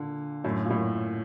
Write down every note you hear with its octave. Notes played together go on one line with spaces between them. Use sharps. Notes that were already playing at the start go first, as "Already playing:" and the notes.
Already playing: A#2 D3
F#2 A2
A#2
F#2 A2